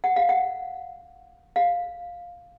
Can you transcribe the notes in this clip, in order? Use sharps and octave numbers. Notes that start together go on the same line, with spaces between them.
F#5
F5
F#5
F5